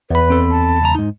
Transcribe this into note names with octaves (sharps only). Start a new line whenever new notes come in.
E2 B4 B5
C4 A4
A5
C#2 A#5
G#2 D#4